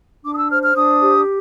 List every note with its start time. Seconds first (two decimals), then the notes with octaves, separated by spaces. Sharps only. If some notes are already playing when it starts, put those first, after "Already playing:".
0.25 D4 D6
0.33 D#6
0.38 E6
0.50 C5 F6
0.63 F6
0.75 D4 D#6
1.00 G4